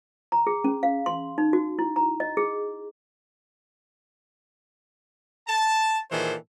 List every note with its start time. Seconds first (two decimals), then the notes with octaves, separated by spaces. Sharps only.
0.32 A#5
0.47 G#4
0.64 C#4
0.83 F5
1.06 C6
1.38 D#4
1.53 F#4
1.79 E4
1.96 A#5
2.20 D#5
2.37 G#4
5.48 A5
6.11 A#2 D#3 E3 G#4 A4 C5